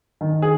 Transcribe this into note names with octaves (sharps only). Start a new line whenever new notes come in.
D#3
G#4